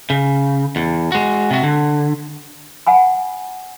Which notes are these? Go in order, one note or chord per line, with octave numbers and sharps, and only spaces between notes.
C#3
E2
G#3 F#4
C3 F#4
D3
F#5 G#5 B5